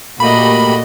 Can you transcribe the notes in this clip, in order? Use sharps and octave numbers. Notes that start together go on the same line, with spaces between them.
A#2 A3 A#3 F#4 G4 D#5 B5